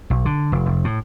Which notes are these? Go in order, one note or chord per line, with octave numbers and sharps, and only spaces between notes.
B1
D3
F1
F1
A2